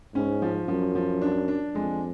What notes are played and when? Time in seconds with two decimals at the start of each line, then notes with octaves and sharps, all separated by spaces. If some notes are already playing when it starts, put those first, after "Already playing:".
0.15 G#2 C#4
0.42 F3
0.68 F#2 F3
0.95 F3
1.22 D4
1.48 D4
1.75 F2 G#3